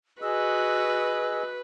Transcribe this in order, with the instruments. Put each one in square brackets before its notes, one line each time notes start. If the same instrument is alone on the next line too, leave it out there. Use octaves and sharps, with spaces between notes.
[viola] F#4 [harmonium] G#4 D#5 [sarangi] B4 [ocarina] E6